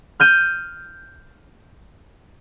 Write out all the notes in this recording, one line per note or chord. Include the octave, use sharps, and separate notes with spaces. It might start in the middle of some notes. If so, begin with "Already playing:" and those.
F6 G6 D#7